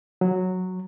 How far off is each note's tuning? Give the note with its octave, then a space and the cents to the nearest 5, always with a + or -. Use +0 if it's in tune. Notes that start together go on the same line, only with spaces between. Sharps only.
F#3 -5